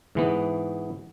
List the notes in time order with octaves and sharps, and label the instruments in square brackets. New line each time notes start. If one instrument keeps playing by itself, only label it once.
[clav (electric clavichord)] G#2 E3 B3